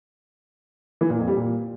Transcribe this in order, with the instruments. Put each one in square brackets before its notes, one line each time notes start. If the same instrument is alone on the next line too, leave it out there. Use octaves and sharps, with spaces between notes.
[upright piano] E3
A#2
F2
G3
A#2